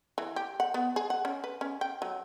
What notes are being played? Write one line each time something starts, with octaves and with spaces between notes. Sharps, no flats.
E3
G4
F#5
B3
G#4
F#5
C#4
B4
C#4
G5
F#3